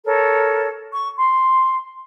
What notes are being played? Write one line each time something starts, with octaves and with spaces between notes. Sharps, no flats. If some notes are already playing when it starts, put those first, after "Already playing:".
A4 A#4 C#5
C#6
C6